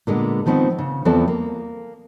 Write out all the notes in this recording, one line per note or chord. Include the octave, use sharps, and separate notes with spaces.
A#2 D3 G#3 B3
D#3 F3 B3 C4 D#4
C#3
E2 F3 B3 C4 A4 D5
A#3